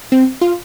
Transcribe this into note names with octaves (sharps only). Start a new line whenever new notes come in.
C4
F4